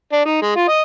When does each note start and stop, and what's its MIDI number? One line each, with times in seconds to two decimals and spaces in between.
0.12 0.22 62
0.25 0.41 63
0.42 0.54 56
0.56 0.64 65
0.68 0.82 75